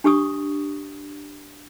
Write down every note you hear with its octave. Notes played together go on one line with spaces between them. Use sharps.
D4 G4 C#6 D#6